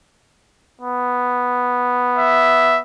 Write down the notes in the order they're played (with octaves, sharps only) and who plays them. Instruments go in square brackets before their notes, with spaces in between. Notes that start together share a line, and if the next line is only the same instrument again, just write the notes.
[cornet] B3
[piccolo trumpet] E5